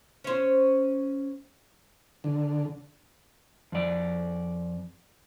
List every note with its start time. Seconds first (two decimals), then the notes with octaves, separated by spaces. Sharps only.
0.24 C#4 C5
2.24 D3
3.72 F2 D5